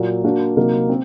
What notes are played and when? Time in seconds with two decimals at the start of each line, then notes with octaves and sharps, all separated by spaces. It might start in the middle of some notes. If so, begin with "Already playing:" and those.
Already playing: A#2 F#3 A#3
0.24 A#3 D4 F#4 A#4
0.57 C3 F#3 A#3 D#4
0.89 C4